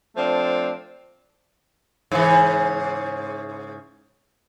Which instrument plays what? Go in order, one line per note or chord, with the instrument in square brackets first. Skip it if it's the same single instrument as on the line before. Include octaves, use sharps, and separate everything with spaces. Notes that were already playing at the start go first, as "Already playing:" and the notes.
[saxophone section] F3 A3 C4 D4
[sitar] G#2 C#3 E3